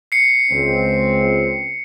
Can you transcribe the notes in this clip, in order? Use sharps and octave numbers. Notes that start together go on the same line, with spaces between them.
C7 C#7
C#2 C4